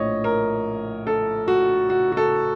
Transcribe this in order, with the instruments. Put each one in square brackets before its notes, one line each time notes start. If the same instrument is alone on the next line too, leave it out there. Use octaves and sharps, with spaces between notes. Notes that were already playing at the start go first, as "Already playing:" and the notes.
Already playing: [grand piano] A#1 A2 F3 C#5 D#5
A#4
A4
F#4
F#4
F#4
A4